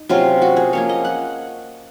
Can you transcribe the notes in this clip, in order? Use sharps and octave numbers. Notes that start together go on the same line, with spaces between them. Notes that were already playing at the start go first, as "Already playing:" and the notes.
Already playing: D#4
C3 F#3 C#4 F4
F#4
G#4
F3 A#3 C#4 C#5
D#5
F#5